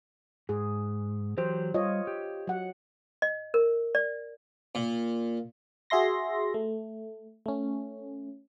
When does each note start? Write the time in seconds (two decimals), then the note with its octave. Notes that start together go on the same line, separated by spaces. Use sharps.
0.49 G#2 G#4
1.38 E3 F#3 G4 C5
1.74 G3 F4 C#5 D#5
2.07 G4
2.47 F#3 F#5
3.22 D#5
3.54 A#4
3.95 D5
4.75 A#2
5.90 F#4 G#4 E5 C6 A#6
6.54 A3
7.46 A3 C#4